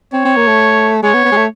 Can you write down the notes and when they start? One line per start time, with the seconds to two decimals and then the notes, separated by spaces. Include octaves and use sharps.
0.13 C4 C#5
0.25 C4
0.37 A#3
0.48 A3
1.03 G#3 C#5
1.14 B3
1.25 B3
1.32 G#3
1.37 A3